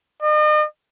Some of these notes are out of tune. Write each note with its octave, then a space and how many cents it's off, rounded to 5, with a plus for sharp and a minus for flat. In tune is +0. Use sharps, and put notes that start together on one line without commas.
D#5 -40